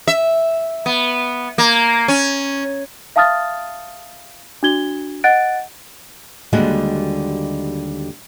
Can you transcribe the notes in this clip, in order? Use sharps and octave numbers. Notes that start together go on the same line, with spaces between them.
E5
B3
A#3
C#4
E5 F5 A5 D#6 F6 A6
D4 F#4 G#6 G7
D#5 F#5 F#6 A6 D7
D#2 D3 G3 G#3 F#4 F#5